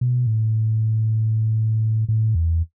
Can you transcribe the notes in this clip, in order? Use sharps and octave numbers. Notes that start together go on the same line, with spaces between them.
B2
A2
A2
E2